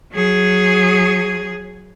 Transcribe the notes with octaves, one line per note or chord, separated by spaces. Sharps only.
F#3 G#4